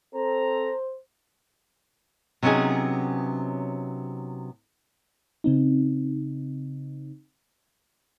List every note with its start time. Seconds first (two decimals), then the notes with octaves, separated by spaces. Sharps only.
0.15 C4 A4 C5 A#5
2.43 C3 F#3 B3 C#4 D#4 G#4
5.44 C#3 C4 D#4